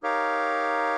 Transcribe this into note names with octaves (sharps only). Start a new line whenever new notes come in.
D#4 G4 A#4 C#5 F5